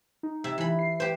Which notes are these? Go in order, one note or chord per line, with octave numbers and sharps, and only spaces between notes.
D#4
C3 E5
E3 B5
C7
G4 B4 C5